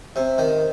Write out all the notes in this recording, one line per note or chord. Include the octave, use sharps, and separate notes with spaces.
C3
D#3